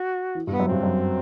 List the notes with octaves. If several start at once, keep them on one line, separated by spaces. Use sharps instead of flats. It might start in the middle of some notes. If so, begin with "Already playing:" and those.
Already playing: F#4
E3
G2
B3
F#2
G2 C4
F#2